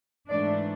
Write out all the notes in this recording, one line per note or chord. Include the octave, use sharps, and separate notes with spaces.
G#2 E3 A3 D4 D5